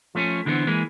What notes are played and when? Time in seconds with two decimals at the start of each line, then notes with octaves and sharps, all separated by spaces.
0.15 F3 A3 C#4
0.46 D3 E3 G#3 B3 C4
0.67 E3 G#3 A#3